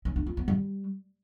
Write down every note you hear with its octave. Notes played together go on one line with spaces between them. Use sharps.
C#4
D4
F4
B3
G3